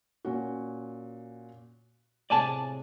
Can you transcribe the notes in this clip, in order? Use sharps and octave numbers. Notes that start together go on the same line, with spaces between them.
A#2 C#4 F#4
A2 C3 G#3 D5 G#5 A5